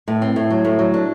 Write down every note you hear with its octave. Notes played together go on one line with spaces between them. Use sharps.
A2
C4
A2
F#3
A2
F#3
D4